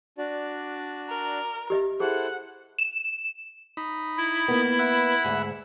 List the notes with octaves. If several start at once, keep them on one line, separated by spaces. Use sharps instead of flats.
D4 F#4 D5
A#4
G4 D#5 E5
E4 G#4 A4 C5 F#5
E7
D#4 B5
E4
A#3 B3
E5 F#5 B5
D2 G#2